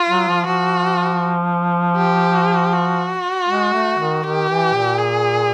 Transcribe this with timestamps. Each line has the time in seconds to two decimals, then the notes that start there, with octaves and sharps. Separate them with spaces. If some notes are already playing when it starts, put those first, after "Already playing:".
Already playing: F4
0.09 F#3
0.28 F3
0.47 F3 F#4
1.97 G4
2.73 F#4
3.49 G#3
3.73 A3
3.99 D#3
4.23 D#3 G4
4.49 E3
4.74 A#2
4.99 G#4